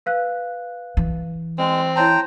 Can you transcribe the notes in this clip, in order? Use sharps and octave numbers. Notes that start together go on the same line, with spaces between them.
B4 F5 F#6
E3
G#3 C4
E4 C5 C#5 G5 A5 A#5